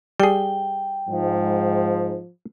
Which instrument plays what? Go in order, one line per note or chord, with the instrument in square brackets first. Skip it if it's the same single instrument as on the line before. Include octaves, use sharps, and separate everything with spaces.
[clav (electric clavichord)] G3 G#4 [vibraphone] G5
[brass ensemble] G#2 [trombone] F3